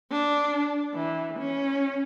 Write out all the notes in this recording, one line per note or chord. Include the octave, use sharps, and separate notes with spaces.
D4
E3
C#4